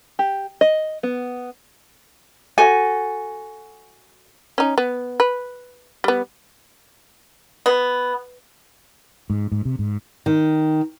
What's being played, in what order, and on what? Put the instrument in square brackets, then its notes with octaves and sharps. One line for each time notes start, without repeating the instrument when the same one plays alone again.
[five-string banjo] G4
D#5
B3
[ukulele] F#4 A4 G#5
[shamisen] C#4 D#4
B3
B4
G3 B3
[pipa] B3
[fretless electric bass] G#2
G#2
C3
G#2
[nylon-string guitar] D#3